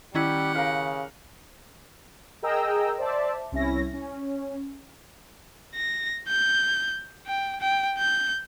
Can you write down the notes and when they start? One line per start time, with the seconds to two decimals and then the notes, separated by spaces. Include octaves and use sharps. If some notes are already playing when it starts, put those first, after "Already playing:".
0.15 D#3 G3 C#4 E4 G4 F#5
0.55 C#3 A#4 F5
2.43 G#4 A#4 D#5 G5 A#5 E6
2.98 C5 D5 E5 A5
3.52 C2 C#4 E4 A#6
3.94 C#4
5.75 A#6
6.28 G6
7.27 G5
7.60 G5
7.98 G6